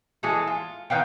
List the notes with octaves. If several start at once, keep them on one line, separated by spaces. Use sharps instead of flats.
E3 G#3 G#4 A4
F4
D#3 B3 F5 G5